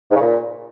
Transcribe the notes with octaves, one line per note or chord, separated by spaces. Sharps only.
G#2
C#3
A#2